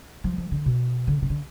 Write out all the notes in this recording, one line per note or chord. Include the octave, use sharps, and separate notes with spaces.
F3
F3
D3
B2
D3
C#3
D3